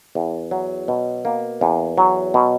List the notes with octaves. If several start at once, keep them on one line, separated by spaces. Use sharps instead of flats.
E2
F#3
B2
A#3
E2
F#3
B2